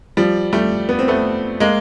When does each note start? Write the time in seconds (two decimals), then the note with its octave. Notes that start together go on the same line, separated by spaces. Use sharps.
0.17 F3 G3
0.53 G3 A3
0.89 B3
0.99 C4
1.08 A3 B3
1.60 G#3 A#3